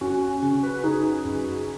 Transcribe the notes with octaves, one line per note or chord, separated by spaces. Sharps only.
F#2 C#4 F#4
C#4
C#3 C#4
F#4 B4
C#3 D#4 G#4
F#2